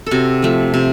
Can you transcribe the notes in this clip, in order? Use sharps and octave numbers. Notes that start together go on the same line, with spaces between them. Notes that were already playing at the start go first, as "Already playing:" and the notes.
C3 F#4 A4
F3 A3
C3